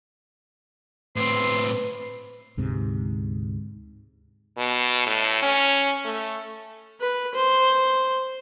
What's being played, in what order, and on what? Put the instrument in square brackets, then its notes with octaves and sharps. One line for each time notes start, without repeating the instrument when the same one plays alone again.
[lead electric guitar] A2 C4 [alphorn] B4 [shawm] C6
[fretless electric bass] D2 G#2 C3
[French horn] B2
A2
C#4
A3
[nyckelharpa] B4
C5